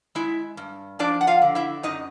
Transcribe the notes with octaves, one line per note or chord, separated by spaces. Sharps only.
G#3 E4 E5
G2
F3 D4 D5
F#5
F4 F5
D3
E4 E5
F#2 D#4 D#5